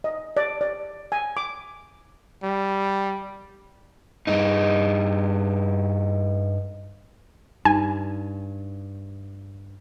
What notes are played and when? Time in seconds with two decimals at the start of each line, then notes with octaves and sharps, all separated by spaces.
0.04 D#5
0.37 D5
0.61 D5
1.12 G#5
1.37 D6
2.43 G3
4.27 G2 D#4
7.65 G2 D#4 G#5